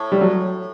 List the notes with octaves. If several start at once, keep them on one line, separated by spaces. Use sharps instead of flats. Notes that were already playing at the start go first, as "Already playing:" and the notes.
Already playing: A2
G3
F#3